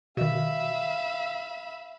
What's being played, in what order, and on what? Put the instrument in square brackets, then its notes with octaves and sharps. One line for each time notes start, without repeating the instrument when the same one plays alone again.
[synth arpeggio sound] B2 D#3 [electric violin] E5 B5 [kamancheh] F5